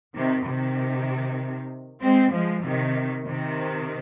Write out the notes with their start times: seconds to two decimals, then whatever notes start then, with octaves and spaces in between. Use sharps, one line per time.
0.15 C3 D#3
0.46 C3 D#3
2.02 G#3 C4
2.33 F3 G#3
2.64 C3 D#3
3.27 C3 D#3